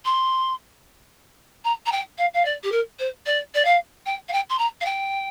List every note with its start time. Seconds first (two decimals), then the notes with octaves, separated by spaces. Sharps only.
0.05 C6
1.64 A#5
1.86 A#5
1.92 G5
2.18 F5
2.34 F5
2.45 D5
2.63 G4
2.72 A#4
2.99 C5
3.26 D5
3.54 D5
3.65 F5
4.06 G5
4.28 F5
4.32 G5
4.49 C6
4.58 A#5
4.81 F5
4.85 G5